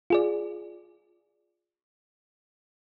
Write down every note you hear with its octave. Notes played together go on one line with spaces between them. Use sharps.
F4 G#4 D5